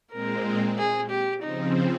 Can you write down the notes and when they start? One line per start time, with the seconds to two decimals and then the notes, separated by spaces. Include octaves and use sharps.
0.12 A#2 G#3 C4 A#4
0.78 G#4
1.10 G4
1.42 C#3 F3 C4 D#4